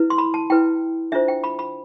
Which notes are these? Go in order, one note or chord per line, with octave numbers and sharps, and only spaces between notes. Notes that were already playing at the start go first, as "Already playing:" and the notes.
Already playing: E4 B4
C6
B5
A5
E4 B4 G5
D4 F4 C5 E5
G5
B5
B5